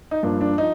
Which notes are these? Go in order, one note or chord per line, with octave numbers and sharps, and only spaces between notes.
D#4
G2 F3 A#3 D4
D4
F3 D#4